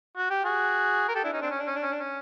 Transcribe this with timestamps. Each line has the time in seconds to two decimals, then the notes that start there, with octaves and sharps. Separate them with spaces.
0.17 F#4
0.30 G4
0.44 F#4 G#4
1.09 A#4
1.15 G4 A4
1.24 D4 E4
1.33 C#4 D#4
1.41 C4 D4
1.50 C#4
1.59 D4
1.67 C#4
1.75 D4
1.83 C#4
1.91 D4
1.99 C#4